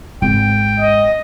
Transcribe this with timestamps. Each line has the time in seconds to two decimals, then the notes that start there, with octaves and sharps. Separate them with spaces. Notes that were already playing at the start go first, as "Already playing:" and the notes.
0.22 G#1 G5
0.80 D#5